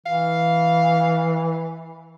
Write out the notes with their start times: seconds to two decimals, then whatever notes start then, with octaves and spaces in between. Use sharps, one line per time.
0.06 E3 F5